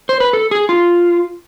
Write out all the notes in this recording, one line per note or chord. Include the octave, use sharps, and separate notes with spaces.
C5
B4
A4
G#4
F4